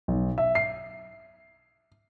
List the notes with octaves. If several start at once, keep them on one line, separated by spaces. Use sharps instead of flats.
B1
E5
C7